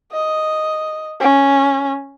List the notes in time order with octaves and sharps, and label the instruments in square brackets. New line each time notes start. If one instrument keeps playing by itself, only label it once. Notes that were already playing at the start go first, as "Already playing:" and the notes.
[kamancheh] D#5
C#4